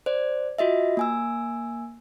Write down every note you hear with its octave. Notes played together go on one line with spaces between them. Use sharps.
C5 D5
F4 F#4 D#5 E5
A#3 G#5 E6